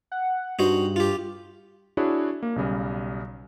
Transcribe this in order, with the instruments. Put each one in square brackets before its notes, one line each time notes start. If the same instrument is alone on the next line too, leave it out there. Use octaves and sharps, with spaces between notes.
[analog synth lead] F#5
[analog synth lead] G2 [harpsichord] D#4 F#4 C5
[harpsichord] F4 G4
[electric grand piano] D4 E4 F#4 G#4 C#5
A#3
B1 C#3 G3